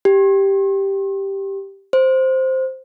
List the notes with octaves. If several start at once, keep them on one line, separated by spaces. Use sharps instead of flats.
G4
C5